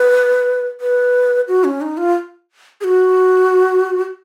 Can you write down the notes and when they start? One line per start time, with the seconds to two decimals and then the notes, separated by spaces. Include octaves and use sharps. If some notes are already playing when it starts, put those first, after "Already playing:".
Already playing: B4
0.81 B4
1.48 F#4
1.64 C#4
1.81 D#4
1.97 F4
2.81 G#4
2.84 F#4